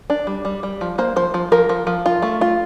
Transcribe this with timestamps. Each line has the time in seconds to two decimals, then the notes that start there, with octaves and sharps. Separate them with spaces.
0.10 D4
0.27 G3
0.45 G3
0.63 G3
0.81 F3
0.98 A#3 C5
1.16 F3 C5
1.34 F3
1.52 F3 A#4
1.69 F3
1.87 F3
2.06 F4
2.22 A3
2.41 F4